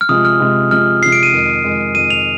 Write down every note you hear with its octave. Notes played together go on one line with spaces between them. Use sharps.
F6
C3 F3 G#3 D#6
F6
C3 F3 G#3
C3 F3 G#3 F6
C3 F3 G#3 C7
D7
D#7
F2 D#3 G#3
F2 D#3 G#3
F2 D#3 G#3 D#7
F7